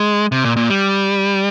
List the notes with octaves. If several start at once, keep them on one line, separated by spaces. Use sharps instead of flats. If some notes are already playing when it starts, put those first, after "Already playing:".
Already playing: G#3
C3
A#2
A#2
G3